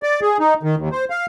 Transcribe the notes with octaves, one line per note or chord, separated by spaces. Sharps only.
D5
G#4
D#4
D#3
D#2
C5
F5